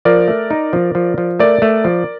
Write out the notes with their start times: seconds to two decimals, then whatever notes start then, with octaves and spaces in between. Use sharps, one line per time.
0.05 F3 A#4 D5
0.28 A3
0.51 D#4
0.73 F3
0.95 F3
1.18 F3
1.40 A3 A#4 D5
1.62 A3
1.84 F3